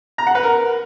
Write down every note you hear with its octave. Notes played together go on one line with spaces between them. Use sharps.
A#5
F#5
B4
A#4